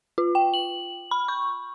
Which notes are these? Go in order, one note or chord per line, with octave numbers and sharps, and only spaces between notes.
F4
G5
F#7
B5
C#6